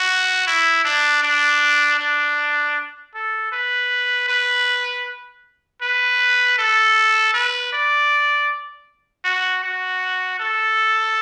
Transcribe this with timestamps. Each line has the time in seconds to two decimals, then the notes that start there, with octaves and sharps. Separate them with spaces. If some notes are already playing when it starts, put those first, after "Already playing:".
Already playing: F#4
0.47 E4
0.85 D4
1.23 D4
1.99 D4
3.15 A4
3.52 B4
4.28 B4
5.82 B4
6.59 A4
7.34 B4
7.73 D5
9.25 F#4
9.64 F#4
10.40 A4